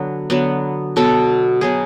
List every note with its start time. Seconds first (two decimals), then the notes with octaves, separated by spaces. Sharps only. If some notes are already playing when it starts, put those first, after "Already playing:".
Already playing: D3 F#3 B3
0.30 D3 F#3 B3
0.96 B2 F#3 B3 A4
1.61 B2 F#3 B3 G#4